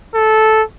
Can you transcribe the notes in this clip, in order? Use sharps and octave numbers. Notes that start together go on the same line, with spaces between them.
A4